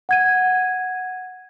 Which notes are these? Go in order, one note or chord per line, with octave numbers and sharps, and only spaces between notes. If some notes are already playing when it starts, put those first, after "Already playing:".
F#5 G#6 D#7